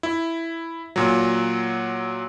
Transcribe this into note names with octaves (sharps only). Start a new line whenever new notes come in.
E4
A#2 F#3